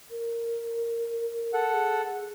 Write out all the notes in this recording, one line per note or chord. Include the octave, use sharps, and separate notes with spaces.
A#4
A4 F#5
G#4